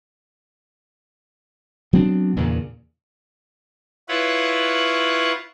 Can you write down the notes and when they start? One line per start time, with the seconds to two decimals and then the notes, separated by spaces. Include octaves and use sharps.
1.93 F#3 B3 C4 D4
2.36 E2 G2 A#2 C#3
4.09 E4 F4 B4 C#5 F#5